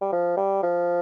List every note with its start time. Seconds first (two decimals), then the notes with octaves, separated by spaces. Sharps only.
0.01 G3
0.12 F3
0.37 G3
0.63 F3